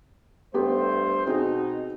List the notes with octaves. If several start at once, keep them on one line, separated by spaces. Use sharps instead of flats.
G2 A3 B3 G4 A4 C5
B2 C4 D#4 F#4 G#4